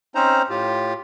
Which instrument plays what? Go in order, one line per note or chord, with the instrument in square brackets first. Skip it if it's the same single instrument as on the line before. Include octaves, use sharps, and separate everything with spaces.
[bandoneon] C4 C#4 D#4 C5 A#5
A2 F4 G4